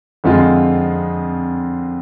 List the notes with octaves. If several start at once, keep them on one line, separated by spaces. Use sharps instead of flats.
F2 D3 G#3 C4 F4